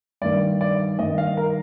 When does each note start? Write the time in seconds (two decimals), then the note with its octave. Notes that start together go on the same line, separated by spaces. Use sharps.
0.22 G2 D#3 D5
0.61 D5
0.99 G2 D#3 D#5
1.18 F5
1.37 A#4